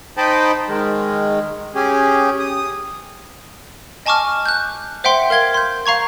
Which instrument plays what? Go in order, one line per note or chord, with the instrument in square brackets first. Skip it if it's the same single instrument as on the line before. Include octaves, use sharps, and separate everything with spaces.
[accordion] D#4 C5 D#5 G5 A5 B5
D#3 G#3
C#4 G4 G#4
D#6
[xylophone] D#5 G#5 A5 C#6 D6 F6
F#6 G6
C5 E5 F#5 G5 C6 G7
A#4 F5 G#6 G7
C6 G6
F5 A#5 C#6 G#6